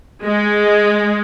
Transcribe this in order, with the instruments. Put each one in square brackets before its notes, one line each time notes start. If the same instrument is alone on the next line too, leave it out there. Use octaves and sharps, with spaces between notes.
[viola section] G#3